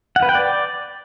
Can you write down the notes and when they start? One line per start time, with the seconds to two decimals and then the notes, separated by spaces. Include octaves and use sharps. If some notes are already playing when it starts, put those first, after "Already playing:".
0.16 F#5
0.22 B4
0.29 G5
0.35 D5